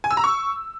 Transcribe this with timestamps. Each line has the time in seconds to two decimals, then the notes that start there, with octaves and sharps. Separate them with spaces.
0.04 G#5
0.11 E6
0.17 A#5
0.24 C#6